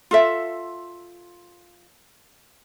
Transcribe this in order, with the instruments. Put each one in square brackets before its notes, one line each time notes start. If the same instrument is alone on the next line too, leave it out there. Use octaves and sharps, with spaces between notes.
[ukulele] F4 A4 E5